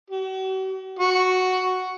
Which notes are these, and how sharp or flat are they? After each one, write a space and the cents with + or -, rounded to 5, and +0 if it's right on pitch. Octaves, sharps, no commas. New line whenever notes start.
F#4 +45
F#4 +0